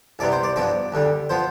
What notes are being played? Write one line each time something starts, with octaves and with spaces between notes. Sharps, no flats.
C2 C3 G3 B3 D5
C5
D5
G2 F3 B3 D5
D2 D3 G3
F3 B3 C5